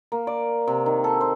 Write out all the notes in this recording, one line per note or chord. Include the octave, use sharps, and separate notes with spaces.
A#3
D5
C3
D#3
A4
C5